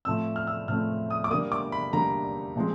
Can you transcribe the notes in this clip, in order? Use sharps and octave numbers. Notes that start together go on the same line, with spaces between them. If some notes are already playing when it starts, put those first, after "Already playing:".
A2 F3 A3 C4 E6
F6
E6
A2 F3 A3 C4 F6
D#6
D6
D3 G3 A#3 D#6
D6
B5
D3 G3 A#3 A#5
A#2 F3 G#3 C4